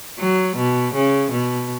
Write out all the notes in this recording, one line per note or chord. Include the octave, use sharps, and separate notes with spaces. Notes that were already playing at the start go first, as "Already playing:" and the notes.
F#3
B2
C#3
B2